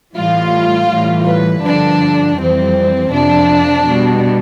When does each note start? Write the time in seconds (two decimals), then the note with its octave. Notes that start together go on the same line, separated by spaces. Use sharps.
0.16 A2 E3 G3 F4
0.89 A2 E3 G3
1.27 B4
1.63 G2 D3 F3 D4
2.37 F2 E3 G3 C4
3.11 F2 C3 F3 D4
3.85 B2 G3